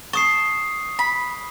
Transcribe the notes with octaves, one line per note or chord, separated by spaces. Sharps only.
A5 C#6 D#6 C7
B5